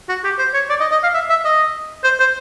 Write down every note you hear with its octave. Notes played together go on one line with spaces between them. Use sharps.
F#4
G4
C5
C#5
D5
D#5
D#5
F5
E5
E5
D#5
C5
C5